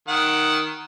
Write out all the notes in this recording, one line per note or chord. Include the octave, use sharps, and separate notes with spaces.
D#3 F#5